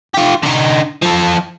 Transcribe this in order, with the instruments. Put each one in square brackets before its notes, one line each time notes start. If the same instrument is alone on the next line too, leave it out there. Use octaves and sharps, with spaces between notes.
[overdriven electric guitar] F4 G4
D3 D#4
F3 A4